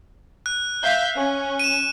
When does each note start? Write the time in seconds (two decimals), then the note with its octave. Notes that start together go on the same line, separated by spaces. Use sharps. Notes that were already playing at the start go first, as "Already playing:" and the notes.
0.46 F#6
0.83 E5 F5 G6
1.16 C#4
1.59 D#7 E7